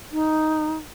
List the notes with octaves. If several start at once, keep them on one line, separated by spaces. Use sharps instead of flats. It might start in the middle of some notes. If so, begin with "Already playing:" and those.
D#4